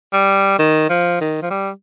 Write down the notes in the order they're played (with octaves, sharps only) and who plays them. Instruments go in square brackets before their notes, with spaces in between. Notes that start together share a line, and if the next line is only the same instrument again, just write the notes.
[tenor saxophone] G3
D#3
F3
D#3
F3
G3